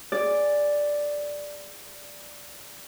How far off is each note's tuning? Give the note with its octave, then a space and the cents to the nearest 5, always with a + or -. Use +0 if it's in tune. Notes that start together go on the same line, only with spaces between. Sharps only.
G#4 -10 D5 +0